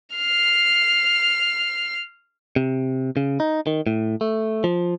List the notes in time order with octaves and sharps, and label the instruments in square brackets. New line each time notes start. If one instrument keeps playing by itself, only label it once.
[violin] F6 C7
[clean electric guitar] C3
C#3
D#4
D#3
A2
A3
F3